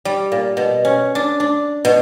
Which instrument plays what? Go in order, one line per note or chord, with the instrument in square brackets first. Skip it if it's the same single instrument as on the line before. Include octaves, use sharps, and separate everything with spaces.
[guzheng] G3
A#2
B2
C#4
D4
D4
B2